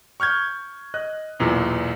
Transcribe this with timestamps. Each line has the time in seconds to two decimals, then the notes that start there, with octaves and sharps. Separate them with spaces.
0.20 C#6 F6 G6 G#6
0.94 D#5 F#6
1.39 B1 E2 A#2